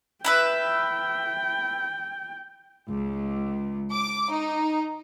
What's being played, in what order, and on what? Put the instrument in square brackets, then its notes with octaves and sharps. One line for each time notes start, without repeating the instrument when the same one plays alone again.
[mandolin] E4 B4 E5 [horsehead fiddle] G5
[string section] C#2
D6
D#4